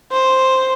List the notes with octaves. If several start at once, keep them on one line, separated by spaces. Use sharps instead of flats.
C5